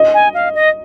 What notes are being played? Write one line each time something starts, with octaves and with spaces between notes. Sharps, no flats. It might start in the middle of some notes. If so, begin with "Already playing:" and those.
Already playing: D#5
G#5
F5
D#5